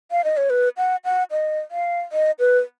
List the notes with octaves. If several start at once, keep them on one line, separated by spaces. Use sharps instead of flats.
F5
D#5
C#5
B4
F#5
F#5
D#5
F5
D#5
B4